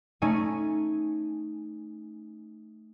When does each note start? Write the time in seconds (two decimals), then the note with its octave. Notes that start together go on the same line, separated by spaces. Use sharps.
0.22 A3 C#4 D#4 G#5